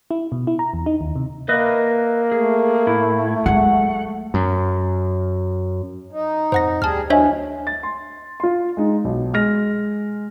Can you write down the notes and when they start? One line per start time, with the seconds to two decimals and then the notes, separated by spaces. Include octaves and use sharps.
0.11 E4
0.32 B2
0.47 E4
0.59 A#5
0.73 E2
0.86 D#4
1.01 D#2
1.16 C3
1.49 A#3 B4 D#5 E5
2.32 A3 G#4
2.87 A2 E4
3.46 F#3 G#3 F#5
4.34 F#2
6.12 D#4
6.52 F2 C5 F#5 A#6
6.82 D2 G3 G#4 A5 F6
7.10 E2 F#3 D4 C5 C#5 D#5 E5 G#5
7.67 A6
7.83 C6
8.40 F4 C6
8.77 G#3 D#4
9.04 B1
9.33 G#3 F6 A#6